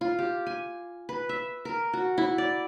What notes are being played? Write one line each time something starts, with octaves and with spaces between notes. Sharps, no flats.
F4
G4
G#5
B4
E5
A#4
F#4
E4
D5